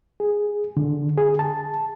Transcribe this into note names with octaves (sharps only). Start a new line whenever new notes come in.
G#4
D3
G#4
A5